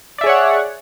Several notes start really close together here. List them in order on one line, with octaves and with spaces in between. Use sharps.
D5 E5 G#4 C#5 F#5